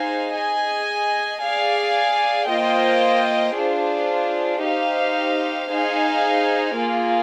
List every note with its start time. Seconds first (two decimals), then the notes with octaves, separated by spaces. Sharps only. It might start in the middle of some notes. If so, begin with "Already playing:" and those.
Already playing: D#4 G#4 C5 F5 G#5
0.36 G#4 D#5 G#5
1.43 G#4 D5 F5 G#5
2.49 A#3 F4 C5 D#5 G5
3.56 D4 F4 G#4 C5
4.63 D#4 G4 C5 F5
5.70 D#4 G#4 C5 F5 G#5
6.76 A#3 F4 G#4